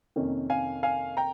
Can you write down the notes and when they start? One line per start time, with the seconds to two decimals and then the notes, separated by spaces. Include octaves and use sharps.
0.16 F2 C3 D#3 A#3 C#4
0.50 F5 G#5
0.83 F5 G#5
1.17 G5 A#5